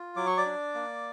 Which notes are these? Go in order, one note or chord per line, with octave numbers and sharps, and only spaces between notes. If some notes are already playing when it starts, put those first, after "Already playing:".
Already playing: F4
F#3 D6
C#6
D5 D6
D4
A#3